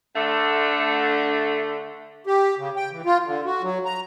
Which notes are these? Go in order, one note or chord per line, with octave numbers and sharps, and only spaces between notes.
D3 A3
G4
C#3
G5
E3
F4
D3
F#4
F#3
A#5